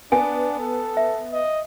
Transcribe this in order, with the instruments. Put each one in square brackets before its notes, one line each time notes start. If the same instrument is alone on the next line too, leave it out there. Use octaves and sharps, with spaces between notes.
[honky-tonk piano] B3 [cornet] D4 [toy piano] G#5
[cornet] A4
[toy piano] E5
[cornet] D#5